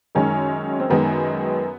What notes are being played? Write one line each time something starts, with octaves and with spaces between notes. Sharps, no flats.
F#2 D#3 G#3 C#4
C4
F#2 D#3 G#3 B3